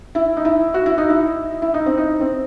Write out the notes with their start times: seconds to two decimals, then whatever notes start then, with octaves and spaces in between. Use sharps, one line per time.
0.15 E4
0.37 D#4
0.45 E4
0.74 F#4
0.86 E4
0.98 D#4
1.10 E4
1.62 E4
1.74 D#4
1.86 C4
1.98 D#4
2.21 C4